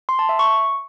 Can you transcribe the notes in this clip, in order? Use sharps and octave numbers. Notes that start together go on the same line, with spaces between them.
C6
A5
E5
C#6